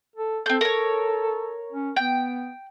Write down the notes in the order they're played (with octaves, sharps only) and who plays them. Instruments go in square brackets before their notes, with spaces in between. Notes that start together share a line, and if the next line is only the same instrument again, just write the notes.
[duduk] A4
[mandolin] C4 G6 [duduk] A4
[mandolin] A#4 C#5
[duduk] C#4
[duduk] B3 [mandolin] G5